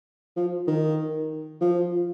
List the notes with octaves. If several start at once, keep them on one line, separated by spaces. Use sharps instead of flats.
F3
D#3
F3